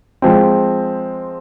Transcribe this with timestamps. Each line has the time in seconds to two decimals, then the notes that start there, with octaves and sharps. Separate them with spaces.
0.22 F3 G#3 C4